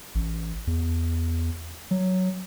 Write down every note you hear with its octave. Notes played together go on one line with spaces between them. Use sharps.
A1
E2
F#3